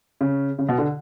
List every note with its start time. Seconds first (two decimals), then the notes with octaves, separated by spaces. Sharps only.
0.21 C#3
0.59 C#3
0.69 B2
0.78 D3